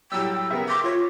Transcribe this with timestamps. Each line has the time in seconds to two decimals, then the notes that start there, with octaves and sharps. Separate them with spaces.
0.12 A2 F#3 G3 G5 E6
0.51 C#3 B3 A#4 E5
0.69 C6 D6 A#6 B6
0.84 F4 C#5